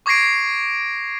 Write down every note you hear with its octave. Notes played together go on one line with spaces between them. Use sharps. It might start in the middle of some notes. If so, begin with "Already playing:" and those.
C#6 D6 G#6 A#6 C7 D7